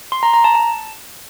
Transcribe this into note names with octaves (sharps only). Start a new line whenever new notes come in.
C6
A#5
A#5
A5
A5